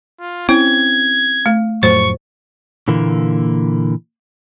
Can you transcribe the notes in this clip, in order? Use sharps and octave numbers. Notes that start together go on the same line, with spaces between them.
F4
C4 C#4 E4 G#6
A3
F2 A2 F#3 C5 C#6
A#2 D3 E3 A#3